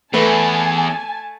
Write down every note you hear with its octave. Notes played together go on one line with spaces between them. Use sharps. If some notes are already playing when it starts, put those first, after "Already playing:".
E2 A3 B4 G#5 A5